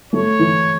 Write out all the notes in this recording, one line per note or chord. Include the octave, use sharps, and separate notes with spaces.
A3 C#5
E3